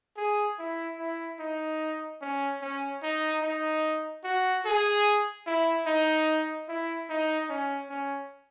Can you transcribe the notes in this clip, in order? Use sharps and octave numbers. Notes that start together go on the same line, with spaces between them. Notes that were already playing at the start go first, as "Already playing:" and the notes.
G#4
E4
E4
D#4
C#4
C#4
D#4
D#4
F#4
G#4
E4
D#4
E4
D#4
C#4
C#4